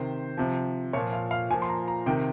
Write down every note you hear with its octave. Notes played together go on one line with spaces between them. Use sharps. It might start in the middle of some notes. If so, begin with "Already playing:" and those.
Already playing: C3 D#3 C5
C3 F3
A#2 F3 C#5
F5
F5
A#2 F3 G#5
C6
A#5
A#5
C3 D#3 G5